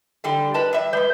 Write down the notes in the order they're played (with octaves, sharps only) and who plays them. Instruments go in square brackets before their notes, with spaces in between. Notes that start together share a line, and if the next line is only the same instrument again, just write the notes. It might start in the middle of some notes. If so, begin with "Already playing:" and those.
[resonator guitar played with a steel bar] D3 G3 G4
B4 D#5 A5
G3 E5
[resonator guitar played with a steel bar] G3 G#3 [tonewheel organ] B4 G6